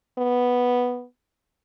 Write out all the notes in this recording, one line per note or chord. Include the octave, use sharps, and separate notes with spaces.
B3